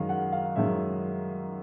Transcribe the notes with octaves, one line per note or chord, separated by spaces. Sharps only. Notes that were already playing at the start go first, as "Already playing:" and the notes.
Already playing: F#2 D#3 G#3 F5
F#5
F5
F#2 D#3 G#3 E5